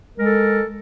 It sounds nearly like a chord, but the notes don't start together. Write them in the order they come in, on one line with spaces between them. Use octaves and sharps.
A#4 G#3 A4